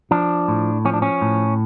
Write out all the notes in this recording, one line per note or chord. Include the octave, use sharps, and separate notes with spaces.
F3 D4
A2
F3 C#4
D4
C#4
A2